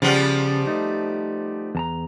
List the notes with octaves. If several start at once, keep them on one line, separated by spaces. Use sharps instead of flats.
C#3 F3 G3 B3
A3 D#4
E2 A5 A#5